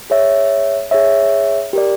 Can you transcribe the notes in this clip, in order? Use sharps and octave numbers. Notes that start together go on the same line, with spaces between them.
G#4 C#5 E5
G#4 C#5 E5
G4 A#4 D5